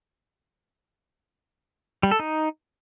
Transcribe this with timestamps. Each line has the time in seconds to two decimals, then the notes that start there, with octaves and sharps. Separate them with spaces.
2.03 G3
2.11 A4
2.20 D#4